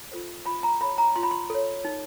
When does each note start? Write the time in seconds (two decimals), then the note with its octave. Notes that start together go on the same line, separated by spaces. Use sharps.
0.11 F4 A4 C5
0.46 F4 B5
0.63 A#5
0.81 A4 C#5 B5
0.98 A#5
1.16 F4 C6
1.23 B5
1.31 C6
1.50 A4 C#5
1.85 D#4